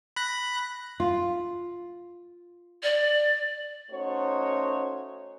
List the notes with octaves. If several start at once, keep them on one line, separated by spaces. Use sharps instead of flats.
B5 F#6 A#6
F4
D5
A3 C#4 D#4 F#4 C5 C#5